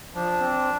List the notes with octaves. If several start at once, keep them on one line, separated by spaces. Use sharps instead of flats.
F3 D4
C4